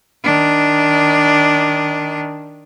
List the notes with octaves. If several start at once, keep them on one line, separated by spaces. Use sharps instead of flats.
D#3 D4